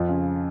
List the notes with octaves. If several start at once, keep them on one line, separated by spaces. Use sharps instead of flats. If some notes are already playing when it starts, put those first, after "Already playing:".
Already playing: F2 F4
C#3